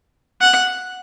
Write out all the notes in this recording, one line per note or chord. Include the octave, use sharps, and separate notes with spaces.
F#5